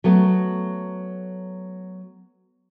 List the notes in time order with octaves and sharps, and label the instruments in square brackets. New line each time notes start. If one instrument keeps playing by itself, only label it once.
[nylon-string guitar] F#3 A3 B3